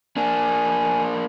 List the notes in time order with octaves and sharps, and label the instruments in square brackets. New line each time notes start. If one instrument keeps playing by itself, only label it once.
[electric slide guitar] A#3 D4 [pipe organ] G#5